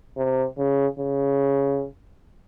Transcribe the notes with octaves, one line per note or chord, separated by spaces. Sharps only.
C3
C#3
C#3